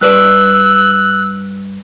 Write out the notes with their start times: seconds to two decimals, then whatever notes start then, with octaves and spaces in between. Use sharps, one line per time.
0.01 G2 B4 D5 E6 F#6